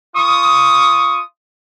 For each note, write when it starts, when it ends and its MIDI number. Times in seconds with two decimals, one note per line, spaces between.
0.16 1.21 65
0.16 1.21 85
0.16 1.21 87